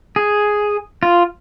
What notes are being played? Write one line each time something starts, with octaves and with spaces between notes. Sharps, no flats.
G#4
F4